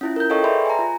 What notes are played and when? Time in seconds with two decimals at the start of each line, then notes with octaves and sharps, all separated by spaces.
0.01 C#4 E4 F4
0.16 A#4 G6
0.30 A4 C#5 D#5 F5 G5 C#6
0.44 G#4 B4 D5 E5 B5 C6
0.66 G#5 A#5
0.79 F4